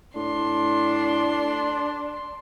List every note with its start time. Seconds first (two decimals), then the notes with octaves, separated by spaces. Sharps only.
0.16 A2 D4 C6